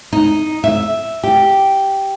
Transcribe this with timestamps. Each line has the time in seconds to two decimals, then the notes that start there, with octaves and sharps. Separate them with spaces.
0.13 D#4
0.64 E5
1.23 G4